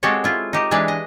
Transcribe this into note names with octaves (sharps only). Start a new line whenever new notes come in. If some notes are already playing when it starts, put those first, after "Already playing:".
G#3 C4 F#4 G4 A4 C#5
E4 F4
D#4 G4
E3 G#3 D4 G4 B4
D#5